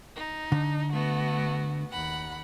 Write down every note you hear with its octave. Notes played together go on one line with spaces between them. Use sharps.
D#4
D3
A3 B3 F#4
D#2 F#5 B5